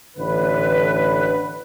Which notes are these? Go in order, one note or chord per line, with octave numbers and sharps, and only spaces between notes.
A1 D3 B4